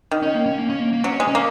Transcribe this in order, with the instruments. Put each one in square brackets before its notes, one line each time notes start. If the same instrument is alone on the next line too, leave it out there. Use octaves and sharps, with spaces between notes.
[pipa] D#3
[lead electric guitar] C#4
A#3
C#4
A#3
C#4
A#3
A#3
[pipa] F#3 [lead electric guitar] C#4
[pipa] G#3
[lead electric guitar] C#4
[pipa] A#3